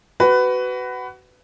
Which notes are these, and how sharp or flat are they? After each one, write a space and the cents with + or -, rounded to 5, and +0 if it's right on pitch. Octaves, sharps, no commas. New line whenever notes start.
F#4 +20 B4 +15